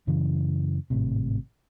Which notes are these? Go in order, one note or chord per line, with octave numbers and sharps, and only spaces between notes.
F#2 C#3 E3
G#1 A2 C3